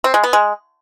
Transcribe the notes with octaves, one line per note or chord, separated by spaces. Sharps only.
C4
G#3
B3
G#3